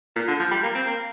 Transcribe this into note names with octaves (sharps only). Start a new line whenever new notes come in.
A#2
D3
F3
G3
A#3
C4
A#3